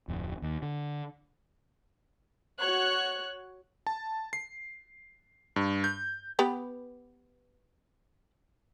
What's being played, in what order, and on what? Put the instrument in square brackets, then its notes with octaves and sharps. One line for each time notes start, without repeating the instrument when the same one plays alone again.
[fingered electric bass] D1 F2
D#2
D3
[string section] F#4 C#5 F#6
[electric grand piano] A5
C7
G2
G6
[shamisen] B3 G4 B4